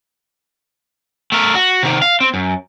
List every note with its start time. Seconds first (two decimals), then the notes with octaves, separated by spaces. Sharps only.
1.32 A3 A#4
1.55 F#4
1.83 C3 D#3
2.02 F5
2.20 C4
2.34 F#2